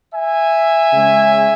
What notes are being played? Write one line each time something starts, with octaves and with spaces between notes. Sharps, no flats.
E5 G#5
C#3 G#3 C#4